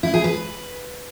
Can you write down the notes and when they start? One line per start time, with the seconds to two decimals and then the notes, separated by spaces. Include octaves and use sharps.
0.03 E4
0.14 G#4
0.24 B4